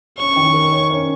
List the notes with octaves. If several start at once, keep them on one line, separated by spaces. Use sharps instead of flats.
C#4 C#6
D#3
A#4
C#5
C#4